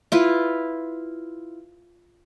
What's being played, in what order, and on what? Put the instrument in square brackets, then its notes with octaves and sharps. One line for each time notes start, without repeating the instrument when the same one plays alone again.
[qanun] E4 F4 B4